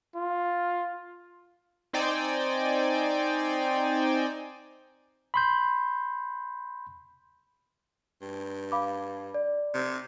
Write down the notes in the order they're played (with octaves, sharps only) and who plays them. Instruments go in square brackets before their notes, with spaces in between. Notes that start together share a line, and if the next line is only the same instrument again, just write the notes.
[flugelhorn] F4
[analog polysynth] C4 D#4 C5 D5 G5 G#5
[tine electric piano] B5 C6 G6
[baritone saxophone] G2
[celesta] F5 B5 D6
D5
[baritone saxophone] C3